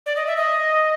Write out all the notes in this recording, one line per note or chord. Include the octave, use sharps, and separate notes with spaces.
D5
D#5
E5
D#5